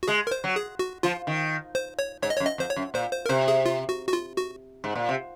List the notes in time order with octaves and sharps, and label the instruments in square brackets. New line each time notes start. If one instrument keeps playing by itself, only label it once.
[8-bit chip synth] F#4
[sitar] G#3 [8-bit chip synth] G#4
[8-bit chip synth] A#4
C5
[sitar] F#3
[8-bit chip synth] G#4
F#4
[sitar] F3 [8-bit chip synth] F4
[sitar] D#3
[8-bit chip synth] C5
C#5
[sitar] G#2 [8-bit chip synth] C#5
[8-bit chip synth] D#5
[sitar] F#2 [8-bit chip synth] C#5
[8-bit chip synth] D#5
[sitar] F2 [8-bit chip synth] C5
[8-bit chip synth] C#5
[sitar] F#2
[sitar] A#2 [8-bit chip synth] C5
[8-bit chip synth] C5
A#4
[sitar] C3 [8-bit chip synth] C5
[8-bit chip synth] G#4
F4
F#4
F#4
F4
F#4
[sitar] G#2
A#2
C3